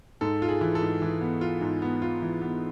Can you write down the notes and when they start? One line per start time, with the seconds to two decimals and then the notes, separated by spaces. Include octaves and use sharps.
0.21 G#2 A4
0.42 F4
0.48 G#4
0.61 E3
0.75 A4
0.82 G#2
1.02 E3
1.21 B3
1.41 F4
1.61 G#2
1.82 B3
2.02 F4
2.22 E3
2.41 B3